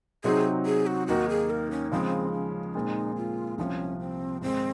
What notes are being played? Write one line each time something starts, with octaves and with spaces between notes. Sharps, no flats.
C3 F#3 C4 D#4 G#4
G#4
F#4
D#2 D#3 A#3 D#4 F#4
G#4
A#4
C#4
C#3 F3 G#3 C4
C#4
A#2 G#3 C4 D#4
F4
C2 C3 F3 C#4 D#4
C4
G#2 D#3 G#3 C4